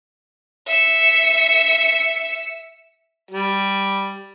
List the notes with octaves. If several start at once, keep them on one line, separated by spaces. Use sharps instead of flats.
E5 C#7
G3